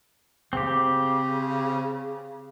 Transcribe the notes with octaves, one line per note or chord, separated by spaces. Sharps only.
C#3 C4 G4